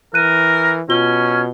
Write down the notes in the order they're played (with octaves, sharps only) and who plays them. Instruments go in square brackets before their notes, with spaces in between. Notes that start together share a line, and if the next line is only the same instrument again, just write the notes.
[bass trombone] E3 [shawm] A#4 [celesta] F#6 D#7
[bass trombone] B2 [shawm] C#4 [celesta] F4 G7